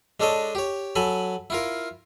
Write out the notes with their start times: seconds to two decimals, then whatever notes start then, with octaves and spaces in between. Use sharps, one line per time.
0.20 G#3 D4 A4 C#5 D#5
0.55 G4 C#5
0.95 F#3 A4 G#5 B5
1.50 E4 F4 A#4